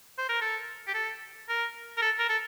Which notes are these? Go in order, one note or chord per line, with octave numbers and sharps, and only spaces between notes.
C5
A#4
A4
G4
A4
A#4
A#4
A4
A#4
A4